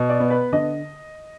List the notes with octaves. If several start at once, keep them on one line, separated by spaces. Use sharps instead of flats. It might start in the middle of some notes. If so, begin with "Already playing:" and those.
Already playing: B2
D5
B3
B4
D3 D#5